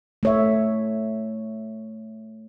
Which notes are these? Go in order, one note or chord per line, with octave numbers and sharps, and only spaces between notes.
A3 C#5 E5